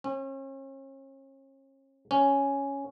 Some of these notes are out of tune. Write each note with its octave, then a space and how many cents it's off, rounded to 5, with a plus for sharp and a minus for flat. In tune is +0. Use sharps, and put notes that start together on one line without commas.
C#4 -40
C#4 +0